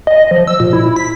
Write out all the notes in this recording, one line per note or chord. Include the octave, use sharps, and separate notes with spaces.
D#5
F3
E6
A#2
E4
B6